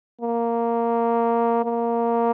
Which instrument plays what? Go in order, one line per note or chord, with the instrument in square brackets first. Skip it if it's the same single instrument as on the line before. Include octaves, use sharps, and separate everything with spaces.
[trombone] A#3
A#3